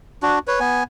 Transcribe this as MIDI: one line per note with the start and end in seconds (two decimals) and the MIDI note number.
0.23 0.39 62
0.23 0.39 66
0.48 0.60 71
0.48 0.60 73
0.60 0.83 59
0.60 0.83 80